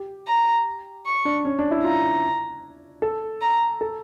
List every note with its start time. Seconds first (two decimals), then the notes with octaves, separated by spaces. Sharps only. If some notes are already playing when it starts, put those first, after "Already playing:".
Already playing: G4
0.28 A#5
1.06 C#6
1.25 D4
1.45 C#4
1.59 D4
1.71 E4
1.84 F4 A#5
3.02 A4
3.41 A#5
3.81 A4